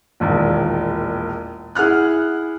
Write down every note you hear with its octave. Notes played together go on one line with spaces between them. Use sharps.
E1 A#1 D#2
E4 G#4 F#5 F6 F#6